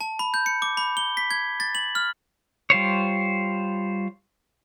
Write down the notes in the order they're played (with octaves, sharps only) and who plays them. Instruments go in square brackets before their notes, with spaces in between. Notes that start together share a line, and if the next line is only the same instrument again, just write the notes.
[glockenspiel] A5
B5
G6
C#7
D6
B5
G7
B6
G#6
A6
F#7
F6
[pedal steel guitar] G3 F4 C5 C#5